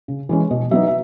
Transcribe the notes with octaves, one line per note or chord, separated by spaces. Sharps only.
C#3
E3 G#3 C#4
B2 D#5
F#3 B3 D#4 E5
E5